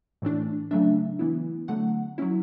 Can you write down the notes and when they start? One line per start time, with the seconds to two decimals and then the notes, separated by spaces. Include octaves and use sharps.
0.22 A2 E3 A3 D4
0.71 C#3 F#3 A3 D4 E5
1.19 E3 B3 E4
1.68 D3 F#3 A3 F#5
2.18 F#3 C#4 E4